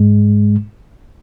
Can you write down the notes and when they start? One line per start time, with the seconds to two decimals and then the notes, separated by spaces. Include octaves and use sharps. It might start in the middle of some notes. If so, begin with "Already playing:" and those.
Already playing: G#2 G#3